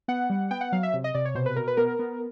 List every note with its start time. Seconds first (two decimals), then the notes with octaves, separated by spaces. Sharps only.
0.08 B3 F#5
0.30 G3
0.51 B3 G5
0.61 F#5
0.72 F#3 F5
0.83 E5
0.94 C3
1.04 D#5
1.14 C3 D5
1.25 C#5
1.35 B2 C5
1.46 B4
1.56 B2 A#4
1.68 B4
1.77 B3 A#4
1.99 B3